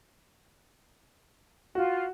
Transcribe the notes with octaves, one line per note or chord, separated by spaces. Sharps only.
F4 F#4